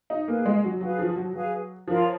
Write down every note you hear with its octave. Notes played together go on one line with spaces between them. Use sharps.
D#4
A#3 G#4 B4 F5 G#5
G#3
F#3
F#3 G#4 B4 F5 G#5
F3
F#3
F#3 G#4 B4 F5 G#5
F3 F4 A#4 C#5 F5